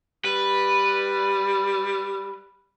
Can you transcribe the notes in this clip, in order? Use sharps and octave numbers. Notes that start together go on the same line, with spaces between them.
G3 B4